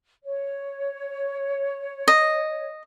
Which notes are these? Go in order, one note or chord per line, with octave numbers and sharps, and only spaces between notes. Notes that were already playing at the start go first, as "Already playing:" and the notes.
C#5
D#5